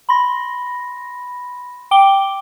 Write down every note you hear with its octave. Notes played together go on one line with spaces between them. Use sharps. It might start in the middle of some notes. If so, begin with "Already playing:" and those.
B5 C6 A#6
G5 D6 G7